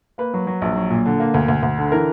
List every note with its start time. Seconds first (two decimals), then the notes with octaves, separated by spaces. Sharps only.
0.18 A#3 B4
0.34 F#3
0.47 F#3
0.62 A#1
0.76 F#3
0.90 A#2
1.06 D3
1.20 A#3
1.34 D2
1.48 D2
1.63 D2
1.78 D3
1.92 E3 A#4